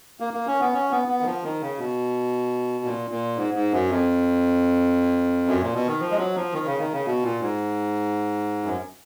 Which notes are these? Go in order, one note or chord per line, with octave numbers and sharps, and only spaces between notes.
A#3
A#3
C#4
B3
C#4
B3
B3
D#3
F3
D#3
C#3
B2
A#2
A#2
G#2
G#2
F#2
F2
F#2
A#2
B2
D#3
F3
G#3
F#3
F3
D#3
C#3
D#3
C#3
B2
A#2
G#2
F#2